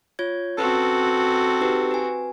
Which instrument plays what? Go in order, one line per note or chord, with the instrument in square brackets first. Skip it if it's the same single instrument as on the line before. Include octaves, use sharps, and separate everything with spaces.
[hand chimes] F4 C#5 G#6
[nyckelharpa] C4 F#4 [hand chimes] C#4 B4 [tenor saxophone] A4
[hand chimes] D#4 G4 B4
B4 G#5